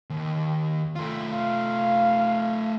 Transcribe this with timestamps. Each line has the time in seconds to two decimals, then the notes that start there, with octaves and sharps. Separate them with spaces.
0.10 D#2
0.96 A3 F4
1.34 F5